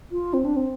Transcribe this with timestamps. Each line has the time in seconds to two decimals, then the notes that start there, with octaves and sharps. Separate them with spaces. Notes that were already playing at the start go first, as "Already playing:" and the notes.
0.12 F4
0.34 C4
0.45 D4
0.56 C4